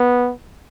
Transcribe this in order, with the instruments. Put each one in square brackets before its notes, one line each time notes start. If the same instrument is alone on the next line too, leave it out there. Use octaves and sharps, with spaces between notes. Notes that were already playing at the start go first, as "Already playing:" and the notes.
Already playing: [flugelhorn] B3